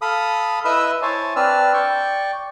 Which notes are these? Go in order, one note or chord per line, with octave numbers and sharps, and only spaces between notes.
A4 F5 B5 D#6
E4 B4 D#5 E5 B5 E6
E4 C5 C#5 G#5 A5
C4 D4 B4 D5 E6 F6
D5 G5 C#6